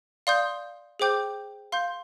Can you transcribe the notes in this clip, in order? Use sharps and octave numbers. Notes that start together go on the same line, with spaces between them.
D5 F5 C6 D#6 G6
G#4 C5 G5 D6 G6
F5 C6 G6